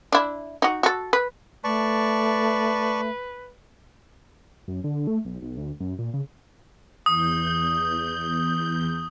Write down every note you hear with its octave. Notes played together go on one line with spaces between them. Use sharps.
D4 E4
D#4 F#4
F#4 A4
B4
A3 B4 D5 A5 C#6
F#2
D3
A3
B1
B1
D2
F#2
A#2
C#3
E2 D#6 G6